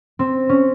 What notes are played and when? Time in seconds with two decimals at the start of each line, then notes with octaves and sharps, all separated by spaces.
0.19 C4
0.49 C#4